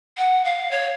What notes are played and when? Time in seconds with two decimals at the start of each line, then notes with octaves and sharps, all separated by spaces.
0.17 F#5
0.44 F5
0.71 C#5